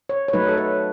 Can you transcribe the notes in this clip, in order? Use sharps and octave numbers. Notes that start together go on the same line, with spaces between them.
C#5
C#5
F#3 A3 D#4 B4
A4
B4